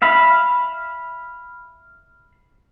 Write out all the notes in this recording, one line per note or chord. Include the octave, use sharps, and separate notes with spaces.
E5 F5 B5